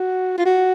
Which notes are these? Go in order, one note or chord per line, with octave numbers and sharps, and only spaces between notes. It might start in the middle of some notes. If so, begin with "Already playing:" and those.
Already playing: F#4
F4
F#4